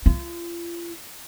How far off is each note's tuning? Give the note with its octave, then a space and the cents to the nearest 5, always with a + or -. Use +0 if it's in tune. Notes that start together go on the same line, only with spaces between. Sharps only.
F4 -35